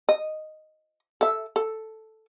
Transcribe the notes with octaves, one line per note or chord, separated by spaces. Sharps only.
D#5
A4 E5
A4